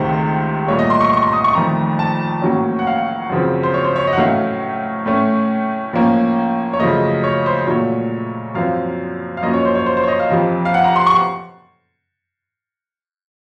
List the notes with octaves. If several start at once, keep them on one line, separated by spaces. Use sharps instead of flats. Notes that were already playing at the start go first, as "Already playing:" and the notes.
Already playing: C#2 C3 D#3 A3 C5
C2 A#2 A3 C#5
D#5
C6
C#6
C#6
C6
D#6
C#6
F2 D#3 A3 A#5
A5
A2 F#3 A#3 C#4
F#5
F5
F#2 C#3 F3 C4
C5
C#5
C5
C#5
D#5
F#5
A2 F#3 A3 C#4 F5
A2 A3 C#4
A2 F3 A#3 C#4
C#5
F#2 C#3 F3 A3 D#5
C#5
C5
A#2 F#3 A3 C#5
F#2 F3 C4 F5
F5
F#2 F3 A#3 C#4 D#5
C#5
C5
C#5
C5
C5
C#5
D#5
F5
F2 C3 F3
F5
F#5
A#5
C6
C#6